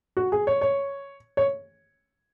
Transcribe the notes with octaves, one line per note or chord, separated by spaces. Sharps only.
F#4
G#4
C#5
C#5
C#5